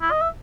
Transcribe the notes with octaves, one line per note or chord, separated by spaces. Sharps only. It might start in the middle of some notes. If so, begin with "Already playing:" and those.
E4
D#5
E5